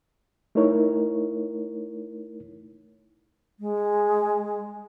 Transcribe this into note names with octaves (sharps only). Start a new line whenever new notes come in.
A3 D#4 E4 A#4 C#5
G#3